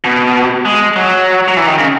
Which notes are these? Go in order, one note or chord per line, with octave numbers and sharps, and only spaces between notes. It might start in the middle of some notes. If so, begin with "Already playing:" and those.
B2
G#3
F#3
F#3
E3
D#3
C#3